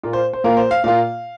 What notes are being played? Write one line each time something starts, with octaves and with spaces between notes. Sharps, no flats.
A#2 A#3 F4
C5
C5
A#2 A#3 F4 A#4
C5
F5
A#2 A#3 F4 F5